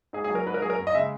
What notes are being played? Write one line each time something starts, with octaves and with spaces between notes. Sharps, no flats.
G#2 G#4
G#4
F#3
A#4
G#2 B4
A#4
F#3 G#4
A#4
F#2
D#5
C#3 G#3 E5